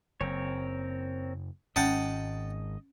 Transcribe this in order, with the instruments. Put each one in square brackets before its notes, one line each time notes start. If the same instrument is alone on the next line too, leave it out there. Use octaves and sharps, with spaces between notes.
[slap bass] F#1 [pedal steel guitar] C4 A#4 C#5
[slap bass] G#1 G#2 [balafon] C#4 [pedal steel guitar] D#5 [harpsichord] F#5 G5 A5